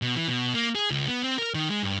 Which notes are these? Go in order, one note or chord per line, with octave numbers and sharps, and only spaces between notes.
B2
E3
B2
A#3
G#4
C#2
B3
C4
A#4
D#3
G#3
G2